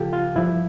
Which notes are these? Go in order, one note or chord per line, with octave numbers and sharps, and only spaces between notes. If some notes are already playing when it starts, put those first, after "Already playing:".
Already playing: C#3 F3 F4 G4 A4
F4
G2 F3 E4